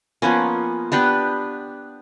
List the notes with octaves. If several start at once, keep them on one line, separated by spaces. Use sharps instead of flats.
F3 A#3 B3 C#4
B3 D4 G4 B4